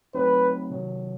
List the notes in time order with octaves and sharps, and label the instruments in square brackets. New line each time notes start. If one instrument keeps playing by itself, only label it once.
[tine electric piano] F#3 A3 C4 D#4 [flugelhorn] B4
[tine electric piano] C3 D#3 F#3